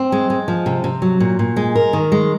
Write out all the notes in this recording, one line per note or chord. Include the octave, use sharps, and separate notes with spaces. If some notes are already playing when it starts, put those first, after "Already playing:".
Already playing: C4
G#3
G#3
F3
C3
C3
F#3
A#2
A#2
G#3
A#4
D#3
G#3